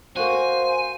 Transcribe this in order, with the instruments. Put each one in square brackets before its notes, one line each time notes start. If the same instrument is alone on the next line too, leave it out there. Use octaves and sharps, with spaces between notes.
[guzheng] A#3 F#4 [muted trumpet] C5 [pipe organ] F5 [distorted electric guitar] G#5